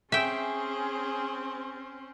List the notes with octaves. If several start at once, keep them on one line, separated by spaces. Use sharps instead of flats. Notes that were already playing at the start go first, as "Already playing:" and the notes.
C4 C#4 G#4 E5 G5